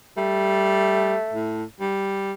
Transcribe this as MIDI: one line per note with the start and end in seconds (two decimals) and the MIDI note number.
0.17 1.15 55
0.17 1.61 57
1.33 1.64 45
1.81 2.33 55